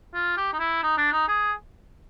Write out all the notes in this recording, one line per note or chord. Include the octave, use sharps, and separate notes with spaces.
F4
G4
D#4
E4
D#4
D4
D#4
G#4